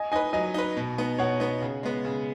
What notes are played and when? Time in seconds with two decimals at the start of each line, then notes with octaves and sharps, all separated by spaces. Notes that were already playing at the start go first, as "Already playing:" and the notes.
Already playing: D#5 G#5
0.12 D#4 B4 D#5 G#5
0.33 F#3 D#5 G#5
0.54 D#4 B4
0.77 B2
0.98 B3 D#4
1.19 B2 C#5 F#5
1.40 B3 D#4
1.62 C#3
1.83 G#3 B3
2.05 C#3